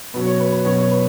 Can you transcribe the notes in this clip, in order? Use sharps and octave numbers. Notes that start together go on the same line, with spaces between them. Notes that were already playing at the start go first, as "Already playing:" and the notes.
B2 F#3 C#4 B4
C#5
B4
B4
B2 F#3 C#4 C#5
C#5
B4